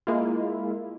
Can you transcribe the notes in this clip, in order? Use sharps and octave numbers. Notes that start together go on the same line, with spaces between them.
G#3 A#3 E4 F4